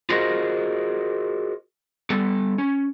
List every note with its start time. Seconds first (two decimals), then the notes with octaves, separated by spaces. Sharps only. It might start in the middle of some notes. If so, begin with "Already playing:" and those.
0.10 F4 F#4 G#4 A#4 C5 D#5
2.10 G3 B3 A4
2.58 C#4